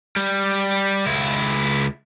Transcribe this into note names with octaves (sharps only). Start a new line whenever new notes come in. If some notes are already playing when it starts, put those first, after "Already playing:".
G3
C#2 E4